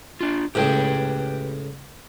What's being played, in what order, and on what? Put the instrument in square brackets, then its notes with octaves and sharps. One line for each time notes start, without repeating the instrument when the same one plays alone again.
[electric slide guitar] D4 F4
[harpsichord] C#2 A2 [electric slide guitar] G4 B4 G5